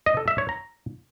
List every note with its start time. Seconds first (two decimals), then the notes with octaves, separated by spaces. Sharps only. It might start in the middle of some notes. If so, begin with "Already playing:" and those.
0.06 D#5
0.17 A4
0.28 E5
0.38 C#5
0.49 A#5